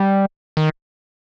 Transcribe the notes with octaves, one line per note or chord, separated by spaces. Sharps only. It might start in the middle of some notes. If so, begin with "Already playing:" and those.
Already playing: G3
D#3